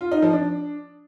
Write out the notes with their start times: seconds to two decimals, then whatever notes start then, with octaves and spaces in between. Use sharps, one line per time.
0.01 F4
0.11 D#4
0.22 F3
0.33 D4